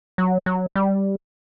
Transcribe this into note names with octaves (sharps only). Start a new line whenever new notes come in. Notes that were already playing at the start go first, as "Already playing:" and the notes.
F#3
F#3
G3